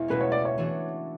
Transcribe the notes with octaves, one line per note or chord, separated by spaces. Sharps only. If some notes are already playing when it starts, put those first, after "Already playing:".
Already playing: E1 E2
C#2 B2 A3 C#4 B4
C#5
D5
C#5
E3 A3 D4 F#4